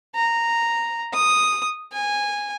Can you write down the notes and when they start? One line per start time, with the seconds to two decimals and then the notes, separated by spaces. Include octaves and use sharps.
0.15 A#5
1.14 D#6
1.93 G#5